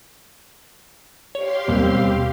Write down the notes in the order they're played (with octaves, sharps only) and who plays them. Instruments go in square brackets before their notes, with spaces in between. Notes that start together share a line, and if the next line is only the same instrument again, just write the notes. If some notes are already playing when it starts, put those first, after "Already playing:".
[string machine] G4 F5 C6 [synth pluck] C#5
[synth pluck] D#2 [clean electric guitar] B2 G3 C4